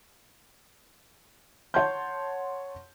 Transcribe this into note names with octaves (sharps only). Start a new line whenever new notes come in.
C#5 F#5 A5 C6 G6